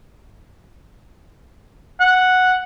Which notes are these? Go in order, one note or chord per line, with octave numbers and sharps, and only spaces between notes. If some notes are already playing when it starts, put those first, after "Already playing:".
F#5